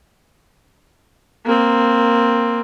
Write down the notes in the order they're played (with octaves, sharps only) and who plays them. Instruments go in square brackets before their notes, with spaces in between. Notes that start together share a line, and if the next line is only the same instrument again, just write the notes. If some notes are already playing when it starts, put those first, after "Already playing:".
[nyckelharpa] A#3 C4